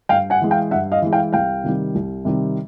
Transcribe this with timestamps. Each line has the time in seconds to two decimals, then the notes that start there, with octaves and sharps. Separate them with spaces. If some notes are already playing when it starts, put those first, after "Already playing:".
0.09 G2 F5 G5
0.30 F#5 G#5
0.41 E3 G#3
0.51 F5 G5
0.71 G2 E5 F#5
0.92 D#5 F5
1.02 E3 G#3
1.13 F5 G5
1.33 C2 F5 G5
1.64 C3 D#3 G3
1.95 C2
2.25 C3 D#3 G3